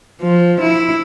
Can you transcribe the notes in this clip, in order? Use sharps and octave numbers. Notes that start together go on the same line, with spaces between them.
F3
E4